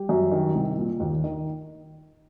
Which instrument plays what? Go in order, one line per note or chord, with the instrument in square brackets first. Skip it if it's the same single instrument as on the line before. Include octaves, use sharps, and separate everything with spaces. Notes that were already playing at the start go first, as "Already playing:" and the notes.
Already playing: [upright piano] G3 G4
F#2
D#3
C2
A#2
D#2
D#3